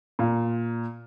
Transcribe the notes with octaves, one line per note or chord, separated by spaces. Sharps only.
A#2